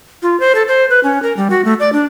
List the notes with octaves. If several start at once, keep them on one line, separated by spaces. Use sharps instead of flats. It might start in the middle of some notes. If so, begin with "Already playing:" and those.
F4
C5
A4
C5
B4
C#4
A#4
G3
F#4
A3
D5
D4